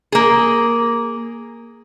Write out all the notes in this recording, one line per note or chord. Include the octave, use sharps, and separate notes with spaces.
A#3 G#4